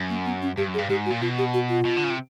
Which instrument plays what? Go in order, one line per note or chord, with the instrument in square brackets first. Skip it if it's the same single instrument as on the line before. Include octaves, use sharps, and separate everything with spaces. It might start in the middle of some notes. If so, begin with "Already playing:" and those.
Already playing: [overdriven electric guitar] F#2
[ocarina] A#3
B3
C#4
[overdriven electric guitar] G2 [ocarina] G4
[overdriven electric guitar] F#2
[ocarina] G#4
[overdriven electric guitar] G2
[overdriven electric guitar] G#2 [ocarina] G4
[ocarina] F#4
[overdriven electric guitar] A#2
[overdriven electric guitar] B2 [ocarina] F4
[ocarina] G4
F#4
F4
[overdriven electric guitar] B2
D3
C#3
C3